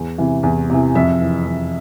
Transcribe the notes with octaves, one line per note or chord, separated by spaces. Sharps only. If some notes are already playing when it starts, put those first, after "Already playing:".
Already playing: E2
C3 E3
E2
C3 E3
F2 E5
E3
F2